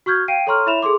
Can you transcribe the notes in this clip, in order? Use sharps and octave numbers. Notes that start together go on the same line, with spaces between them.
F#4 C#6 F6 G6 G#6
F5 G5 C7 D7 D#7
A4 C#5 A#5 C6 C#6 F6
E4 C#5 E5 B5 E7 F7
G#4 A4 C6 D6